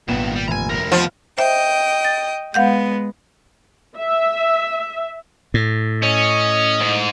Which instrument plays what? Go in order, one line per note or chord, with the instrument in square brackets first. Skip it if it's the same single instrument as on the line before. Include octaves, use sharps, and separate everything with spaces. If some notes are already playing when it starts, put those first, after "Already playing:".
[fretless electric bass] G#1 A#2 [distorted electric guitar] G2 D#3 [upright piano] B3 E7
[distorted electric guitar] G3
[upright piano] F1 [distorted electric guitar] G#5 A#5
[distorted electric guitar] D2 A#4
[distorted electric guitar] D#3 B3 [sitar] F3
[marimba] C5 E5 [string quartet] D#5 G5
[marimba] A6
[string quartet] G#3 B3 [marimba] F5 F#5 G6
[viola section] E5
[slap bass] A2
[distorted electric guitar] C#4 [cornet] D#5
[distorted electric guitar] G#2